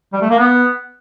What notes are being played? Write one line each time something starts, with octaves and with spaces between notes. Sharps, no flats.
G3
A3
A#3
B3